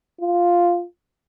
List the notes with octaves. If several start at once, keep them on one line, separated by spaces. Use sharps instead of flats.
F4